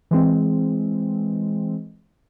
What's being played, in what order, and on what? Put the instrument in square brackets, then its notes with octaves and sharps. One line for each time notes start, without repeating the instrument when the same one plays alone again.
[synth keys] E3 G#3 C4